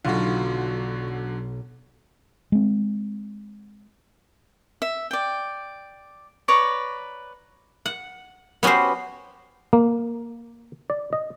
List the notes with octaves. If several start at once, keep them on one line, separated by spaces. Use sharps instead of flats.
B1 D3 F#3 F4 F#4
G#3 C4
E5
D5 G5
B4 C#5 D5 A#5
F#5
B3 C#4 F#4 G4 C5
A#3
D5
D#5